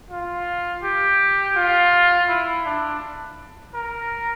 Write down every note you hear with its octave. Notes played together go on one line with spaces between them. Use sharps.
F4
G4
F4
E4
D4
A#4